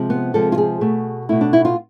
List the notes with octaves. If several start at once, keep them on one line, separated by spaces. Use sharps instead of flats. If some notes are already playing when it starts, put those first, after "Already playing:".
Already playing: C3 F3 G#3
B3
C3 F3 G#3 A4
F4
G#4
B2 A3
B2 A3 E4
D4
E4
F4